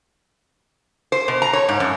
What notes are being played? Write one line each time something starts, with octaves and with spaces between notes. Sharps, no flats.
C5
B2
A#5
C#5
G#2
F#2